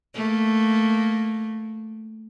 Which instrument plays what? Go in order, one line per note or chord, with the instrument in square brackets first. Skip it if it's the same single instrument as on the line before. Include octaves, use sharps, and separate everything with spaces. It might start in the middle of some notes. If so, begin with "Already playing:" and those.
[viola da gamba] A3 A#3